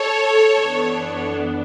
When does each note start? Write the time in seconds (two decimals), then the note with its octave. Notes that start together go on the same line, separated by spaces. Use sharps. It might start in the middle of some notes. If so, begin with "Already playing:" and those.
Already playing: A4 C#5
0.57 F#2 E3 B3 D4